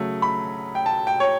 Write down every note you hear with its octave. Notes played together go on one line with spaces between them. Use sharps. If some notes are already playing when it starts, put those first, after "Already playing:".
Already playing: C#3 F#3 A3
B5
G5
A5
G5
C#5